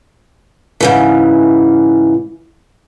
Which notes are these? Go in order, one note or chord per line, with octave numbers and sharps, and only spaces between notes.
G#2 C#3 E3